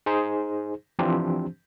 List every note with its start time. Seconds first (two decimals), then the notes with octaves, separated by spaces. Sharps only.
0.06 D#4 G#4 C5
0.99 E3 F3 C4 D4 G4 C5